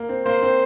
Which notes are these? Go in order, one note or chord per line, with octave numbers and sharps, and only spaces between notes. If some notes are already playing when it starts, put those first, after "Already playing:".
Already playing: A#3
C4
A#3 C5
C4